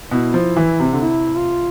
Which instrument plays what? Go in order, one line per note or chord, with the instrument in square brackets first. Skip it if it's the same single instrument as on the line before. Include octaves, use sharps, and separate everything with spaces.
[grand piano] B2 [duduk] E4
[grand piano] F3
E3
C3
D3
[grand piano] C3 [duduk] E4
[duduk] F4